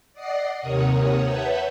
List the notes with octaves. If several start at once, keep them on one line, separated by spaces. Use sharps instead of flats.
D5 D#5 F#5 C7
D#2 C3 A#4 C#5 F#5 D#6
B4 C#5 E5 F#5 A5 G6